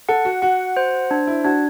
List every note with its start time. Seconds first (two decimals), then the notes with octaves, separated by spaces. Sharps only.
0.09 A4 F#5
0.25 F#4
0.42 F#4 F#5
0.77 C5
1.11 D4
1.27 E4
1.44 D4 F#4